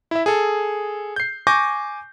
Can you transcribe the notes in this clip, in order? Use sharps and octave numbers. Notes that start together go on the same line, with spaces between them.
E4 E5
G#4 A4
G6 C7
G#5 C#6 D6 G6 A#6